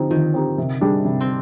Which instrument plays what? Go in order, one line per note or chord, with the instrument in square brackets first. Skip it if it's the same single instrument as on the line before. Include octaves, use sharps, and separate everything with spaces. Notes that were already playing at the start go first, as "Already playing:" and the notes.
Already playing: [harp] D3 [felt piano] F3 C4 D#4 G4
[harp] D#3 [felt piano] F3
[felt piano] C4 D#4 G4
C3
G3 D4 G#4
C3
[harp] C4